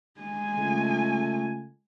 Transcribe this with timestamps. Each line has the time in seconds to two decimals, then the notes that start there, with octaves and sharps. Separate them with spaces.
0.21 G#3 G#5
0.57 C#3 A3 F4